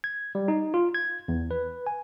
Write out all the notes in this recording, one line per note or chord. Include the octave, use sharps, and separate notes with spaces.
G#6
G3
D#4
F4
G#6
E2
B4
G#5